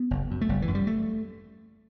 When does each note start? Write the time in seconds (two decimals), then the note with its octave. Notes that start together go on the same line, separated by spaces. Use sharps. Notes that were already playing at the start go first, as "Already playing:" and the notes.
Already playing: B3
0.11 F#1
0.31 F#2
0.41 A3
0.49 F#1 G3
0.62 E3
0.68 F#2
0.75 G3
0.87 A3